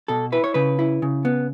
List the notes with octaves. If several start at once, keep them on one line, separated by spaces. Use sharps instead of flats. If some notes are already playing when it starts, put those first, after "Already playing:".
B2 A4
E4 B4
C#5
C#3 B4
E4
C#3
B3